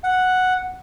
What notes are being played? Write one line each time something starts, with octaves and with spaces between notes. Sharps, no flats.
F#5